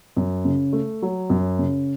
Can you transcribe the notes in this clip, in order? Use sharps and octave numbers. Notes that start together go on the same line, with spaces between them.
F#2
C#3
A3
F#3
F#2
C#3